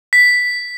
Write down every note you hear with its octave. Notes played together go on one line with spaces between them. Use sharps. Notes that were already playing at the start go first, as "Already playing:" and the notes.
B6